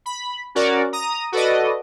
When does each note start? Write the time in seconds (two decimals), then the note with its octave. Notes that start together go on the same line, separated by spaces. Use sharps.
0.06 B5
0.55 C#4 F#4 A#4 D5
0.93 A#5 D#6
1.32 F#4 A4 B4 D5 D#5